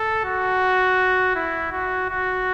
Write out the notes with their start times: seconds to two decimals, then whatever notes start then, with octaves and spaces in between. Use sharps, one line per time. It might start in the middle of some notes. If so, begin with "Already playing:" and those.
Already playing: A4
0.25 F#4
1.36 E4
1.72 F#4
2.09 F#4